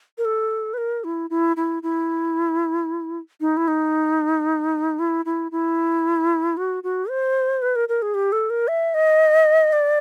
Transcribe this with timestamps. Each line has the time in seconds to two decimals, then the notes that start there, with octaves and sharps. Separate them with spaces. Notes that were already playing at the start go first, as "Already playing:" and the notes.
0.18 A#4
0.25 A4
0.74 B4
0.78 A#4
1.04 E4
1.30 E4
1.57 E4
1.83 E4
3.41 D#4
3.57 E4
3.68 D#4
4.99 E4
5.25 E4
5.52 E4
6.57 F#4
6.84 F#4
7.09 C5
7.62 B4
7.76 A#4
7.89 A#4
8.02 G#4
8.14 G4
8.32 A4
8.50 A#4
8.68 E5
8.94 D#5
9.73 D5